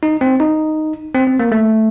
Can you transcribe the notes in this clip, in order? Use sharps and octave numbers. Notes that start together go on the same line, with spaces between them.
D#4
C4
D#4
C4
C4
A#3
A3